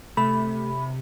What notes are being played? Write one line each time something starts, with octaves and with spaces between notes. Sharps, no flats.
C3 A3 B5